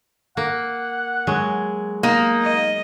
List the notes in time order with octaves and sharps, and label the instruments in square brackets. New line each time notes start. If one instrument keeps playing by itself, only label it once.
[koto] A#3 [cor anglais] F#5
[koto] F#3 G#3
[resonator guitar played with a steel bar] A#3 [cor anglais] D#4
[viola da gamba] D#5